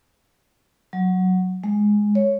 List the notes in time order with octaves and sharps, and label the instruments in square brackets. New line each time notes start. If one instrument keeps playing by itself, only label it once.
[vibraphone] F#3
G#3
C#5